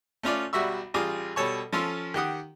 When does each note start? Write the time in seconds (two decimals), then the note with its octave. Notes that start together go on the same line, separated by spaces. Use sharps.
0.23 A3 C#4 F4 D5
0.53 B1 G3 F#4 E5 C#6 E6
0.94 A1 G3 F4 G#4 D6
1.36 B2 G3 A4 C#5 A5 C#6
1.73 F3 C#4 F4 A4 C6 E6
2.14 D#3 G4 F#5 D#6